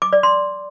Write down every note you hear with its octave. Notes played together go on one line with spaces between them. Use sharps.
D6
D5
C6